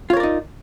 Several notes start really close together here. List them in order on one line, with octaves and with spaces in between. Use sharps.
F4 C#5 A#4 D5 D#4